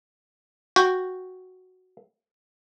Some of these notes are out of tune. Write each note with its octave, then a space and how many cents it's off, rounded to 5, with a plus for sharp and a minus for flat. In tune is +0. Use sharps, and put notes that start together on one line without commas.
F#4 +0 G5 +0